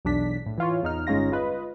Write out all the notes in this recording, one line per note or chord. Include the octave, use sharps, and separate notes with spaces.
B1 E2 D4 B6
A2
E3 F4 C#5
E2 D#4 F6
G1 G#3 C#4 D#4 F4 A#6
F4 B4 D#5